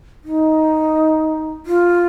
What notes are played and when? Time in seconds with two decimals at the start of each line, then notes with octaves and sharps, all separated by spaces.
0.24 D#4
1.66 F4